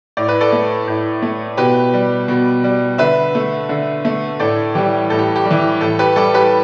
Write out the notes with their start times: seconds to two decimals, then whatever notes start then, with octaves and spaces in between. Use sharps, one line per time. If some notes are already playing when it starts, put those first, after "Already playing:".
0.17 A2 D5
0.29 B4
0.41 A4 D5
0.52 A3
0.87 A2
1.22 A3
1.57 B2 G4 B4
1.93 G3
2.28 B2
2.64 G3
2.98 D3 B4 E5
3.35 A3
3.69 D3
4.05 A3
4.40 A2 A4 D5
4.75 E3 G3 G4
5.10 A2 A4
5.19 G4
5.36 G4
5.46 G3
5.51 E3
5.81 A2 A4
5.99 G4 B4
6.16 G3 A4 D5
6.34 G4 B4